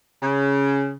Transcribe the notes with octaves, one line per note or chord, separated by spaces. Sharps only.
C#3